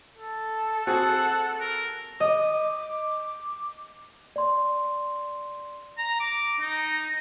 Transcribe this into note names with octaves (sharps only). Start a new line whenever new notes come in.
A4
C4 F#4 G#4 F#5
A#4
D#5 D6
D5 C6
A#5
D6
D#4